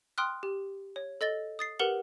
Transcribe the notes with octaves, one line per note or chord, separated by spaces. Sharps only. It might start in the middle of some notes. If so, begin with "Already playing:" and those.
G5 C6 D#6 F6 F#6
G4
C#5
A4 D#5 A6 G7
D#6 A6 C7
G4 A#4 B4 F#5 C#7 F#7